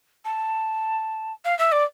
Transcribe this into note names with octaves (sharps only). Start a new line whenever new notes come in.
A5
F5
E5
D5